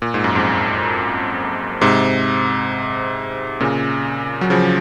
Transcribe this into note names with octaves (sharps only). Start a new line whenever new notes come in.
A#2
G#2
F#2
F2 G#2
G#2 C3
A#2 C#3
F#3
C#3 F3